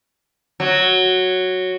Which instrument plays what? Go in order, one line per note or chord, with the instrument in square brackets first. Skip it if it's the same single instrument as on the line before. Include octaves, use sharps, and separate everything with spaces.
[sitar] F#3